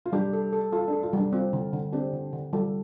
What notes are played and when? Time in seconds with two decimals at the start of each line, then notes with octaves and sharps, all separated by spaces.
0.05 F4
0.13 G3 D4 G4
0.33 A4
0.53 A4
0.73 F4 A4
0.88 D4
0.93 A4
1.03 F4
1.13 G3 D4
1.33 C4 F4
1.53 D3
1.73 D3
1.92 C4 D4 G4
2.13 D3
2.33 D3
2.53 G3 F4 A4